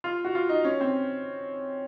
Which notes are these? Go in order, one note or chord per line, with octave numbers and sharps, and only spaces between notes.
F4
F#4
F4
D#4
C#4
C4